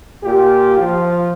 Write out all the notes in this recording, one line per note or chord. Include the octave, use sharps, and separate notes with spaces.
A#2 F4 G4
F3 F4